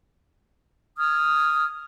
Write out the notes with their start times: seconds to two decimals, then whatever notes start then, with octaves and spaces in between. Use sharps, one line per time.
0.97 D#6 F6 G#6